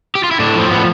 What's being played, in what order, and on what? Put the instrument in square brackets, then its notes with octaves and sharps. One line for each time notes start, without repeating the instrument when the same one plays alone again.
[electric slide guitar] G4
F4
E4
A2 D4
F3
C4
A2 B3